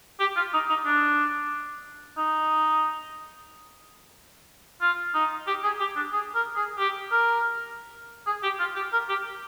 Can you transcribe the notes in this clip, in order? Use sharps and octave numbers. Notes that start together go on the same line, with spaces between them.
G4
F4
D#4
D#4
D4
D#4
F4
D#4
G4
G#4
G4
D4
G#4
A#4
G#4
G4
A#4
G#4
G4
F4
G4
A#4
G4